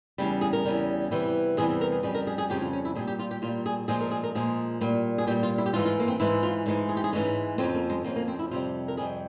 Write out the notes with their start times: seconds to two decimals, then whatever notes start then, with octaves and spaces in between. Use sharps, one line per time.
0.18 E2 C#3 G3
0.41 G#4
0.53 A#4
0.65 E2 C#3 G3
1.11 E2 C3 E3 G3
1.57 E2 C3 E3 G3 G#4
1.69 G#4
1.81 A#4
1.92 G#4
2.03 F2 C#3 G3 G#4
2.15 A#4
2.27 G#4
2.38 G#4
2.50 F2 C#3 G3 G4
2.61 F4
2.73 C#4
2.85 E4
2.95 A#2 G3 G#4
3.07 G4
3.19 F4
3.31 G4
3.42 A#2 F4
3.46 G3
3.66 G#4
3.88 A#2 F3 G#3 G#4
4.01 A#4
4.11 G#4
4.23 A#4
4.35 A#2 F3 G#3 G#4
4.81 A#2 G3
5.18 G#4
5.27 A#2 G4
5.30 G3
5.43 F4
5.58 E4
5.66 G4
5.73 G#2 E3 G#3 F4
5.85 F4
6.00 A#3
6.08 C4
6.20 G#2 E3 G#3 E4
6.43 F4
6.66 G#2 E3 G#3
6.89 G#4
6.97 G4
7.04 G#4
7.13 G#2 E3 G#3 C#4
7.58 F2 C#3 F3 C4
7.74 A#3
7.90 G#3
8.04 F2 C#3 F3 A#3
8.16 A#3
8.28 C4
8.39 E4
8.51 F2 C3 G3 F4
8.88 A#4
8.97 F2 C3 G3 G#4